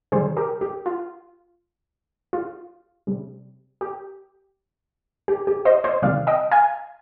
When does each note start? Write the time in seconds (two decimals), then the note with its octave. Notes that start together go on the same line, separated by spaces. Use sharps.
0.12 C3 D#3 G3 G#4 C5
0.37 G4 A#4
0.61 G4
0.86 F4
2.33 F4
3.07 C3 G3
3.81 G4
5.28 G4
5.47 G4
5.65 C5 D#5
5.84 C5 D#5
6.02 C3 D#3 G3 D5 F5
6.27 D#5 G5
6.51 F5 G#5